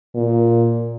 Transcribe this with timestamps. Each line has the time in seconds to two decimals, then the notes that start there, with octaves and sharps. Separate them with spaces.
0.15 A#2